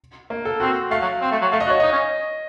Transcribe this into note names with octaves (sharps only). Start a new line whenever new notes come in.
A#3
A4
C4 F#4
A3 F5
F#3
C4
A3
F#3
A3 F5
D#5
F#4
C#5
D#4 D#5
C#4